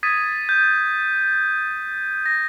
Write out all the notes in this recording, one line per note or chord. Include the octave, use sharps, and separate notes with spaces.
D#6 G#6 A6 B6 D#7
G6
A#6